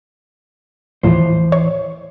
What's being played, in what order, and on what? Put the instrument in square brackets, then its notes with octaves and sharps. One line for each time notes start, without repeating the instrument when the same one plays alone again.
[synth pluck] D#2 A2 F3 [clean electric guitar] E3 C5
[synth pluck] C#5